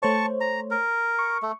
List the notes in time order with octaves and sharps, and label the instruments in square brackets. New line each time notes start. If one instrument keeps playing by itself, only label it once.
[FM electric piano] A3 C5 C#5 [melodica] A5 C#6
[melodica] A#5
A#4
[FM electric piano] C#6
[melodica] A3